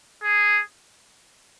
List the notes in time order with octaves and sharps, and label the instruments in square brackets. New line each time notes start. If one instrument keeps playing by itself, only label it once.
[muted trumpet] G#4